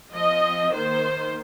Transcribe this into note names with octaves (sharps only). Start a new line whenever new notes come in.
F3 C4 D#5
D#3 A#3 C5